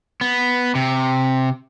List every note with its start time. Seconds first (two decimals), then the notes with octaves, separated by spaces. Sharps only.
0.21 B3
0.75 C3